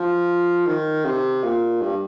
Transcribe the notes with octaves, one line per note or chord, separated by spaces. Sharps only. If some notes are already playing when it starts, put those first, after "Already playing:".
Already playing: F3
D#3
C3
A#2
G2